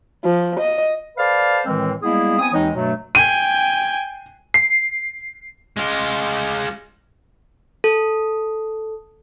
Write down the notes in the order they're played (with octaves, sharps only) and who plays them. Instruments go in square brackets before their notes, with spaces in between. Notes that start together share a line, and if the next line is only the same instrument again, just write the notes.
[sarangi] F3
D#5
[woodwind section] A4 B4 C5 D5 F5
A2 D#3 E3 G#3 C4
G3 G#3 A#3 B3 E4 G#4
B3 C4 G#5 D#6
D#2 E3 G#3 C4 D#4 C#5
G2 B2 F#3 A3
[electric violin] G5 G#5 [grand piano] D#7
[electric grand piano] C7
[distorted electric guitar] G#3 F4
[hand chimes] A4